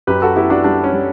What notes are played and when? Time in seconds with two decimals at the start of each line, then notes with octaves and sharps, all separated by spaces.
0.07 F#2 G4 B4
0.22 F#4 A4
0.36 B3 E4 G4
0.50 D4 F#4
0.64 G3 D4
0.84 C#4
0.93 G3